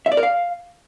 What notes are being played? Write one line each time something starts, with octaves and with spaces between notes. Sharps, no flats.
E5
D5
A#4
F5